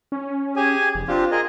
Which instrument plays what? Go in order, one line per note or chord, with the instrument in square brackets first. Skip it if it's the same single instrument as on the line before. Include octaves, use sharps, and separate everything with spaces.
[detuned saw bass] C#4
[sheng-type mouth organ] G4 G#4 G#5
[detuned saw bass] F1
[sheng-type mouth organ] C4 D4 G4 [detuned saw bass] F4
[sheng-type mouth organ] G#4 A#4 D#5